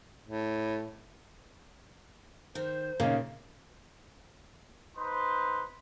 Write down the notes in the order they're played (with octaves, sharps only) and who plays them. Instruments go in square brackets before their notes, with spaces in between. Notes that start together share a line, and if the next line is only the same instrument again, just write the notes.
[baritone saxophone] A2
[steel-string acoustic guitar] D#3 [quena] C5
[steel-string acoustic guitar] A#2 [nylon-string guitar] C#3 [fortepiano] A#3 C#4 D#4
[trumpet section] D#4 B4 C5 C6